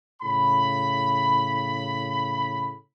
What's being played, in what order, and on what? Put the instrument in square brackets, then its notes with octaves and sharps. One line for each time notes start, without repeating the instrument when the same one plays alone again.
[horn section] A2 C#3 B5